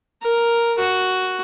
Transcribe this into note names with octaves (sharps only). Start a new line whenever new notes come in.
A#4
F#4